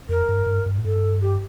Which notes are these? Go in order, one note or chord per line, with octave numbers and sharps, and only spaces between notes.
F2 A#4
G2
G2
G2
A2
G2 A4
G4